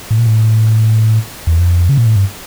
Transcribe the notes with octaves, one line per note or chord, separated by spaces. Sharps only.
A2
A#2
A2
E2
F2
C#3
A#2
A2
G2